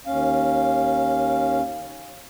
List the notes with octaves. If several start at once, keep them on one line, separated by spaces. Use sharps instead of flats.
D#2 C#4 F5